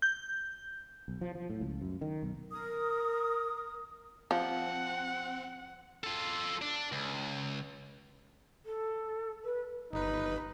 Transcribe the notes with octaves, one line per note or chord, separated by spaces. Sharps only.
G6
B1
F3
F3
A2
C#2
F#2
D#3
B1
A#4 D#6
F3 C4 F#5
F4 A4
D4
C#2
A4
B4
G1 D#4 B4